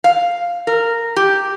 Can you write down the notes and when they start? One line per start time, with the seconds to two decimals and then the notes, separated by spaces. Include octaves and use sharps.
0.04 F5
0.67 A#4
1.16 G4